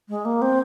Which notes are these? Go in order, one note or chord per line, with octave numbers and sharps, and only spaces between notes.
G#3
A#3
C4